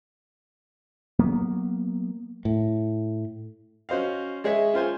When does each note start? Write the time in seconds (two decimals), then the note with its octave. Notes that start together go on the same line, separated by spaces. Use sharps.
1.19 F#3 A#3 B3
2.45 A2
3.89 C#4 F#4 C5 D#5 F5
4.44 G#3 G#4 C#5 D#5 E5
4.74 C#4 F4 C5 G#5